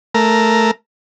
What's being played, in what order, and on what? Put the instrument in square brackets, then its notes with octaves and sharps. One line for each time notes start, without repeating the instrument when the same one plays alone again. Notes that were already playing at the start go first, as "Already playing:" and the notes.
[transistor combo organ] A3 A#4